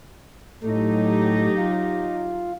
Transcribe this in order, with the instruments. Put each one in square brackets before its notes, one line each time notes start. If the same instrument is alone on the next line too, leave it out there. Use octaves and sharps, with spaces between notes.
[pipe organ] A2 A3 [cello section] F#3 D#4 G4
[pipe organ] F4